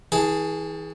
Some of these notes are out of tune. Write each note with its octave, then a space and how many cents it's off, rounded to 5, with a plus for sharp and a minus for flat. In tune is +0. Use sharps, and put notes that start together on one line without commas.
E3 -40 G#4 +0 A5 +0